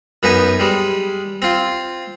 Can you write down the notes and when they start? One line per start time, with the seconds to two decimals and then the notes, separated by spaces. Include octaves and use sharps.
0.23 F#2 B3 D#4 B4 G#5
0.60 G3 G#3
1.42 C4 F4